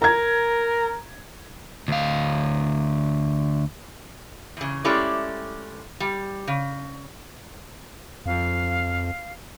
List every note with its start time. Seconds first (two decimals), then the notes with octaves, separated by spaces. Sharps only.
0.02 A#4 A#5 G#6
1.88 D2 F5
4.57 E2 C#3
4.85 G#3 A3 C#4 E4 G4 D5
6.00 G3
6.48 C#3
8.26 F2 F5